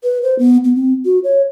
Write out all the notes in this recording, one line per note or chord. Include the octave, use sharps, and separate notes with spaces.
B4
C5
B3
B3
C4
F#4
C#5